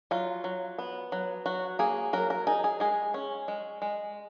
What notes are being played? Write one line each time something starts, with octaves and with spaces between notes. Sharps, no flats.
F#3 F4
F#3
B3
F#3
F#3 F#4
A#3 G#4
F#3 A#4
A#4
D#4 G#4
G#4
G#3 G#4
C#4
G#3
G#3